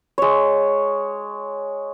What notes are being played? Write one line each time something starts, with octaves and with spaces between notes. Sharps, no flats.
G#3 C#5